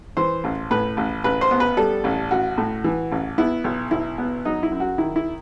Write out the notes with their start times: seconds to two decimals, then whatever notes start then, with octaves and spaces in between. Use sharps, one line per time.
0.17 E3 C5
0.44 A1
0.71 A2 B4
0.97 A1
1.24 A1 B4
1.41 C5
1.51 B3
1.60 B4
1.77 G3 A4
2.04 A1
2.31 A1 F#4
2.58 A2
2.84 E3
3.12 A1
3.38 B3 E4
3.64 B1
3.91 B1 E4
4.18 B3
4.45 F#3 D#4
4.63 E4
4.72 F#2
4.80 F#4
4.98 D#3 E4
5.16 E4